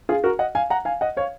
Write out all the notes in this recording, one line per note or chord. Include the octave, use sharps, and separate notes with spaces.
F4 G#4
F#4 A#4
D#5 F#5
F5 G#5
F#5 A#5
F5 G#5
D#5 F#5
C#5 F5